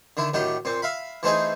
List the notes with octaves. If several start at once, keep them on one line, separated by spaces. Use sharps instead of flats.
D3 D#3 E4
A2 D#3 F#3 D4 G4
A#2 C4
E5 F5 B5
E3 A3 C4 D#4 G#4 G#5